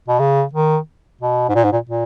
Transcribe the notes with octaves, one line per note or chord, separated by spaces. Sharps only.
B2
C#3
D#3
B2
G#2
A#2
G#2
A#2
A#2